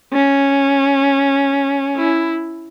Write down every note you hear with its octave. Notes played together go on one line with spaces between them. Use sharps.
C#4
E4